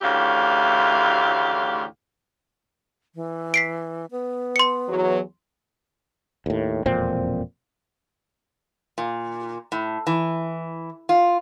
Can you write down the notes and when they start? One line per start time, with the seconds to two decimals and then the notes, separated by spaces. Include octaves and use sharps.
0.02 D2 A2 C#3 E3 G4 F5
3.15 E3
3.54 B6 C7 D7
4.11 B3
4.56 C6 C#7
4.89 E2 F#3
6.46 D#2 A2
6.86 E1 F2 A#2 C4
8.98 A#2
9.72 A2
10.07 E3
11.09 F4